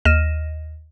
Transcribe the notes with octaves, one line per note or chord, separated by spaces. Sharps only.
D#2 D#5 F6 A#6 D#7 E7